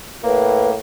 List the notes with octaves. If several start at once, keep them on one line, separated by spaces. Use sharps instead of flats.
A2 A#3 B4